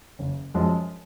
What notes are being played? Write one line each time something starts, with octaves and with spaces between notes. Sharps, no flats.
F#1
F#2 F3 G#3